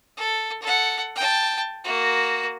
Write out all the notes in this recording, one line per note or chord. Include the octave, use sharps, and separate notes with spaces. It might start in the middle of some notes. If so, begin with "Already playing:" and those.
A4
A4 F#5
G5 A5
A#3 F#4